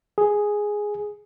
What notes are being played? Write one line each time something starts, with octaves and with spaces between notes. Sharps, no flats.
G#4